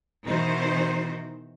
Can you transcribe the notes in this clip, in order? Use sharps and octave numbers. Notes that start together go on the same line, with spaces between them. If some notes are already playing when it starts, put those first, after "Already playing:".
B2 D#3 E3 D#4 F#4 C5